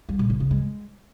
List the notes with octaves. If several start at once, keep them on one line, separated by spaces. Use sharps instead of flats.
G3
A#2
C#3
C#3
G#3